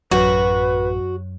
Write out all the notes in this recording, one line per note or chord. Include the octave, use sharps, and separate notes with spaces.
A1 F#2 F#4 B4